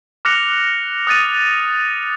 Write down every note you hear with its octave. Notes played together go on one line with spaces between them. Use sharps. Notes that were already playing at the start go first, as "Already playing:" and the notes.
D6 F6 F#6 A#6 C#7 F7
D#6 F#6 A6 D#7